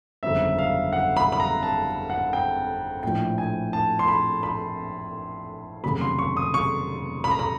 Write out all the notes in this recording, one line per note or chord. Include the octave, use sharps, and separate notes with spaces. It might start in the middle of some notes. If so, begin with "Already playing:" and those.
G1 F2 C#3 F#3 E5
F5
F#5
B5
B5
A#5
A5
F#5
G5
A#1 A2 F3 G5
G#5
A5
C6
B5
B5
F1 D#2 C#3 F#3 B5
C6
C#6
D#6
C#6
B5
A#5
B5